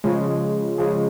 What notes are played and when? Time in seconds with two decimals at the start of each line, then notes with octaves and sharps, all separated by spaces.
0.04 C#3 F3 G#3
0.78 C#3 F3 G#3